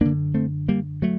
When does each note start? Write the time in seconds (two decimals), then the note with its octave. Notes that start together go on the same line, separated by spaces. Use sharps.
0.01 F#2 D3 A#3 D4
0.34 A3 C4
0.68 G3 A#3
1.02 F#3 A3